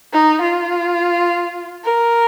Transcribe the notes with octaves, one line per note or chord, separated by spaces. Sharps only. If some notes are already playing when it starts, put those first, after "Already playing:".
D#4
F4
A#4